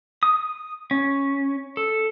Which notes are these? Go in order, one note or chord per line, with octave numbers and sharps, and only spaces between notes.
D#6
C#4
A4